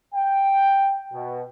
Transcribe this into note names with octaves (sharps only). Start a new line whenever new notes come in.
G5
B2